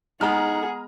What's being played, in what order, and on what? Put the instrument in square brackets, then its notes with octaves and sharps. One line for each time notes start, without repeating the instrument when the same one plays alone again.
[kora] G#3 B3 [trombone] D#4 [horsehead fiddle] G#4 F#5 [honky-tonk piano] A#5 F6